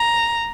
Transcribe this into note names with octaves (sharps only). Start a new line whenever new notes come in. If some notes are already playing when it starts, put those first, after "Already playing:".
Already playing: A#5